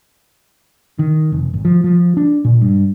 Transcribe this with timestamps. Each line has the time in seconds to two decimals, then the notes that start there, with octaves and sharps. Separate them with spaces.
0.99 D#3
1.32 F1
1.54 G#1
1.65 F3
1.84 F3
2.17 D4
2.45 A#2
2.62 G2